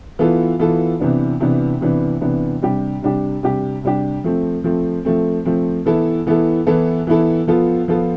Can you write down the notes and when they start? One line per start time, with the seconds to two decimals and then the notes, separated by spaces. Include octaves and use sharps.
0.19 E3 B3 F4 A4
0.59 E3 B3 F4 A4
1.00 C3 E3 B3 D4
1.40 C3 E3 B3 D4
1.81 C3 E3 B3 D4
2.21 C3 E3 B3 D4
2.62 C3 G3 D4 G4
3.02 C3 G3 D4 G4
3.43 C3 G3 D4 G4
3.83 C3 G3 D4 G4
4.24 F3 A3 C4
4.64 F3 A3 C4
5.05 F3 A3 C4
5.45 F3 A3 C4
5.86 E3 B3 E4 A4
6.27 E3 B3 E4 A4
6.67 E3 B3 E4 A4
7.07 E3 B3 E4 A4
7.47 F3 B3 F4 A4
7.88 F3 B3 F4 A4